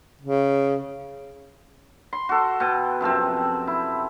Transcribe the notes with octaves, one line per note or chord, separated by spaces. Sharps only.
C#3
C6
F#4 A4
B2 G5
F#2 C3 F3 C4
E4